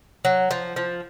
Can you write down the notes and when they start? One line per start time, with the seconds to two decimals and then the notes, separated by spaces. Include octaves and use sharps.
0.25 F#3
0.51 F3
0.76 F3